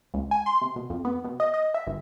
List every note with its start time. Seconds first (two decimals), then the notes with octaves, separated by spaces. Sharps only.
0.14 C#2
0.31 G#5
0.46 C6
0.61 C3
0.76 B2
0.90 F2
1.05 B3
1.25 B2
1.40 D#5
1.54 D#5
1.74 E5
1.87 G1